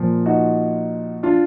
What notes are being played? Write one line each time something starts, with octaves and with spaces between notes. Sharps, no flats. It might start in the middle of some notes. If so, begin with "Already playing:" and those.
Already playing: A#2 F3
D#4 F#4
D4 F4